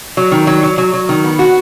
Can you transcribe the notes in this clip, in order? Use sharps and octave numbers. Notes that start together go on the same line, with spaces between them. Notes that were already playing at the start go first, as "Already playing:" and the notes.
F#3
D#3
F#3
F#3
F#3
F#3
D#3
B3
F#4